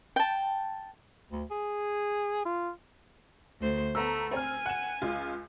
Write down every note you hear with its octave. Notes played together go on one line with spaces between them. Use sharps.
G5 A5
D2
G#4
F4
D2 C5
A3 B3 A#5 E6
C4 G#5 F6
F#5 E7
C#2 F4